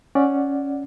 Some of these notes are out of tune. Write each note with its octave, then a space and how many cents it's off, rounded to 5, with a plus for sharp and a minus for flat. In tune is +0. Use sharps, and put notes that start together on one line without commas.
C#4 +0 D5 +0 F#5 +0